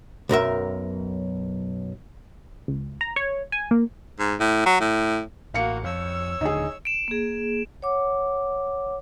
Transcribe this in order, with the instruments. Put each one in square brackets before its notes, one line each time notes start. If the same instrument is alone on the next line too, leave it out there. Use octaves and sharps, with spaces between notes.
[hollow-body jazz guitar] B1 F#2 A#4 E5
[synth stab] C#2
A#5
C#5
G#5
A#3
[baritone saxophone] G#2
A2
F#3
A2
[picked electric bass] A1 [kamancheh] A#3 F#4 [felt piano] F5 C#7
[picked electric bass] F2 [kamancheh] C#5 E6
[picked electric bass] D#1 D3 [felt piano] D#4 G#4
[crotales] D7 E7
[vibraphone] A#3 G#4
C#5 F#5 D6